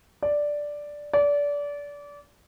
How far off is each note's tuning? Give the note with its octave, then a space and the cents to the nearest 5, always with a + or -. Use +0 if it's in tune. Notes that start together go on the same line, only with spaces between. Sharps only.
D5 +0
D5 -25